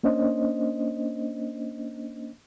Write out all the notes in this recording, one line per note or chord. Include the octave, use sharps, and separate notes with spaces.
A#3 C#4 D4 C5 D#5